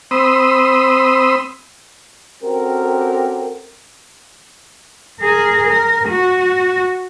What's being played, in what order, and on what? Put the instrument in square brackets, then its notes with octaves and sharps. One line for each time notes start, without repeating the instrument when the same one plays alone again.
[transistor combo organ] C4 B5 C6 D#6 E6
[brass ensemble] C4 C#4 F#4 G4 A4 A#4
[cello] G#4 A#4
A#4
F#4